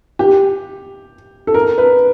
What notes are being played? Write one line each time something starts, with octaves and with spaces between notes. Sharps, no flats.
G4
A4
A#4
B4